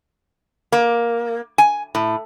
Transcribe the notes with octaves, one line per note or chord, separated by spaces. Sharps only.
A#3
G#5
A2